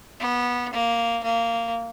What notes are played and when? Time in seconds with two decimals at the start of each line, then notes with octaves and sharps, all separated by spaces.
0.20 B3
0.73 A#3
1.23 A#3